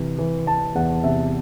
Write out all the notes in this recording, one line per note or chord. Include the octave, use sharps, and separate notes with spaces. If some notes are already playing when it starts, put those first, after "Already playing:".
Already playing: C3 E3
E3
E3 A5
E2 F#5
C3 E5